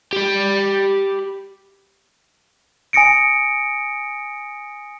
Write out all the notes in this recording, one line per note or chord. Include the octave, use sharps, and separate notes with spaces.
G4 B5
G#5 D#6 A#6 C#7 D7